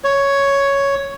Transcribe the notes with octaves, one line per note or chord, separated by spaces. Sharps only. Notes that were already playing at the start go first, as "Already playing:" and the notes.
C#5